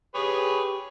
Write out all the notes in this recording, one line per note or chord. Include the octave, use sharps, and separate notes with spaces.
G4 G#4 B4 C#5